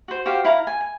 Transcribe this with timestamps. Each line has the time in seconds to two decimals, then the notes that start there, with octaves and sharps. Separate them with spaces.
0.08 F#4 C5
0.26 F#4 G4 C5 F5
0.45 E4 F5 A#5
0.67 G#5
0.81 G#5